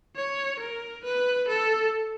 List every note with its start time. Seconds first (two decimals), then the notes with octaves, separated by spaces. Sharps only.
0.16 C#5
0.60 A#4
1.04 B4
1.48 A4